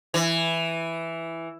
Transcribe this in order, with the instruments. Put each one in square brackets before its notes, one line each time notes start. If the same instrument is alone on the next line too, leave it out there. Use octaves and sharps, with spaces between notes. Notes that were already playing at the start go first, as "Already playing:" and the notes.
[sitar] E3